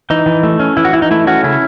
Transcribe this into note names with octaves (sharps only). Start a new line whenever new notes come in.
E3 D#4
E3
A3
C#4
E3 E4
F#4
E3 E4
D#4
A3 E4
C#4 F#4
C#3 E4